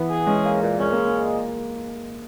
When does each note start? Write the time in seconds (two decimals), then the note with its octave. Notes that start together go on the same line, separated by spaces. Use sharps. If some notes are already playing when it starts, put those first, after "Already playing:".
Already playing: E3 B3
0.09 G#4
0.27 G#3 C#4
0.44 A#3
0.62 A#2
0.79 G#3 C#4
0.92 A#3
0.97 G#3
1.05 A#3
1.14 A#2